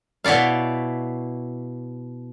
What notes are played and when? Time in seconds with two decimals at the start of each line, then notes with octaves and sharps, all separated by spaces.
0.24 B2 E4 C#5 D5 F5